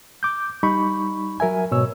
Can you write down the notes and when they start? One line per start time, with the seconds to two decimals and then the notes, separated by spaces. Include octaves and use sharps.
0.23 D6 G6
0.63 G3 D#4 B5 C#6
1.40 F#3 A#4 E5 G#5
1.71 G#2 B2 C#5 E6